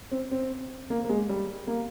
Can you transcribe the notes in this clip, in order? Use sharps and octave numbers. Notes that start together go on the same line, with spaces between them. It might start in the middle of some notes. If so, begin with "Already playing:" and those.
C4
C4
A#3
A#3
G#3
G3
A#3